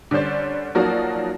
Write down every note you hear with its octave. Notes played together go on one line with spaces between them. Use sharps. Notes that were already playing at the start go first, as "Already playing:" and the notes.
D3 G3 C#4 C5 D5
F3 F#3 A#3 D#4 F#4 D5